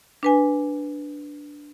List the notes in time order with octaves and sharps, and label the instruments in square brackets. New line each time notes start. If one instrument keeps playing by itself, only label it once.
[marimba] D4 B4 G#5